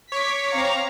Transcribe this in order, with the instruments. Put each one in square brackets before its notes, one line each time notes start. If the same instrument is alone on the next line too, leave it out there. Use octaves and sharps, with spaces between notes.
[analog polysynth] C#5 C#6 D6 [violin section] B6
[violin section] C4 F5 A#5